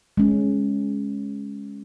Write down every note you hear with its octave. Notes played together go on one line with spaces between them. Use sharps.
G#3 C#4